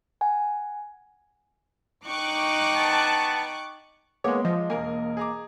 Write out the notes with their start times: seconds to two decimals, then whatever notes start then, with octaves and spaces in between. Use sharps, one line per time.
0.21 F#5 G#5
2.07 D#4 G5 C#6 D6 F#6
2.76 B3 A5
4.24 G#3 A#3 B3 G#4 C#5 D6
4.45 F3 D#5
4.70 E1 A#3 A#4 G#5
5.17 G#4 A#5 D6